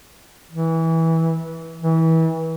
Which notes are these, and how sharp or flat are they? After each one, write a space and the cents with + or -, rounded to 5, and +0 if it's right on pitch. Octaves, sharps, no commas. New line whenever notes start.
E3 -20
E3 -25